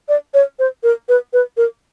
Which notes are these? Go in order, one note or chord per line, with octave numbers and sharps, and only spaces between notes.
D5
C#5
C5
A#4
B4
B4
A#4